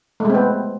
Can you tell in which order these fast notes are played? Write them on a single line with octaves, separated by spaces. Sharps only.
A3 G#3 C4 B3